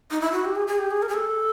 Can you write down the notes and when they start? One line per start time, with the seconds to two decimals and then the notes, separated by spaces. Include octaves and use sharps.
0.11 D#4
0.21 E4
0.32 F#4
0.45 G4
0.55 G#4
0.68 G#4
0.79 G4
0.91 G#4
1.02 A#4
1.09 G#4
1.14 A4